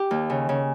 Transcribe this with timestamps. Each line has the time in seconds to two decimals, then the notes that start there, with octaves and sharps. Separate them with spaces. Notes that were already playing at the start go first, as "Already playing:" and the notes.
Already playing: G4
0.11 D#2
0.30 C#3
0.49 C#3